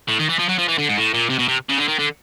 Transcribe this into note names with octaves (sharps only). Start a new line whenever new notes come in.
A2
D#3
E3
F3
F#3
F3
E3
D3
G#2
A2
A#2
C3
B2
C3
C#3
D3
D#3
D3